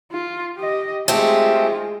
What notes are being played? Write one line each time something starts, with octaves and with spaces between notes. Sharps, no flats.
F4
G4 D#5
G#3 A3 C4 F4 G4